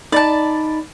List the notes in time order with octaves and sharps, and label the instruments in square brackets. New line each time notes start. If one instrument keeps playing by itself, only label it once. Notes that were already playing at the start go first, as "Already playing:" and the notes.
[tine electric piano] D#4 B5 A6 [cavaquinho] D5 A5